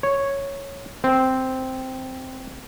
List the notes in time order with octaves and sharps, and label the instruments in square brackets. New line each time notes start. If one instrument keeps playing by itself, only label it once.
[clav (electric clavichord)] C#5
C4